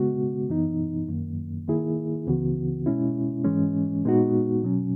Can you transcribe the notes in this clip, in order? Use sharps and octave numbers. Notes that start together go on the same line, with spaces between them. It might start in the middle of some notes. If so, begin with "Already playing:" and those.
Already playing: C#3 G#3 B3 F#4
F#2 E3 B3 D#4
F#2 D#3 A#3
D#3 A#3 E4 G#4
C#2 C#3 E3 B3 F#4
B2 G#3 C#4 E4
G#2 E3 G#3 C#4
A#2 G#3 B3 D#4 F#4
B2 F#3 C#4